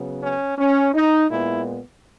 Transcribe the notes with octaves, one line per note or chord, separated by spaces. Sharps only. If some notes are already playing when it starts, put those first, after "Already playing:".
Already playing: C#3 F#3 B3
C#4
C#4
D#4
A#2 G#3 B3 E4